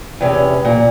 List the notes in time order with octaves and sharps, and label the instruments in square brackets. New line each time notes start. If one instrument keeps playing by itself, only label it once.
[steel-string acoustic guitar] E2 C3 C#4
A#2